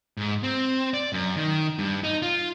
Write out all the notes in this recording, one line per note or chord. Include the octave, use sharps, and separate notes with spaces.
G#2
C4
D5
F#2
D#3
G2
D#4
F4